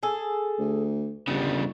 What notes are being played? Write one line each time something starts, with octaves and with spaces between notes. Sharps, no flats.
G#4 A4
D2
G1 C#3 G3 F#4